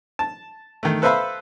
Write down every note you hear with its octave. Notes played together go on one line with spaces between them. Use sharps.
A5
D#3 A3
A4 B4 C5 E5 F5 B5